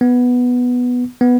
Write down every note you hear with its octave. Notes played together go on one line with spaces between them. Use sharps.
B3
B3